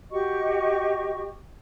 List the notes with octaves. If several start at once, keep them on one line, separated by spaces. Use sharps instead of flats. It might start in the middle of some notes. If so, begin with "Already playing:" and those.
F#4 G4 D#5 C#6